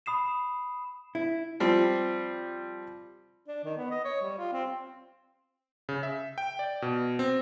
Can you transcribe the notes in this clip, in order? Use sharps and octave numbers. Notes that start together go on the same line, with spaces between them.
B5 D#6 C7 E7
E4
F3 G3 C4
D4
D#3
B3
D#5
C#5
G3
F4
C4
C#3
E5
G5
D5
B2
C4